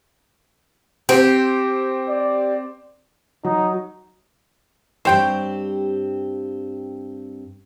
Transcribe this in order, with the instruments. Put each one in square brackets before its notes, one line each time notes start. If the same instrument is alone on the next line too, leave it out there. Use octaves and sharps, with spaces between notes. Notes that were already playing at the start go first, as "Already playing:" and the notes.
[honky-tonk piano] C4 [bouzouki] G4
[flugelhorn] D5
[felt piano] F#3 [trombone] D#4
[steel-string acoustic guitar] G2 C4 G4 [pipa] C5 C#5 G5